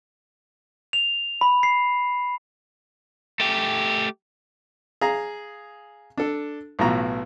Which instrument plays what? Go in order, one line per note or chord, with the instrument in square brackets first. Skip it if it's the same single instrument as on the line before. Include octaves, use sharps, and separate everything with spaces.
[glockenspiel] F7
B5
C7
[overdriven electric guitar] A3 G4
[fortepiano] G#4 F5 A#5
D4 A4
B1 A2 E3 F4 F#4 A#5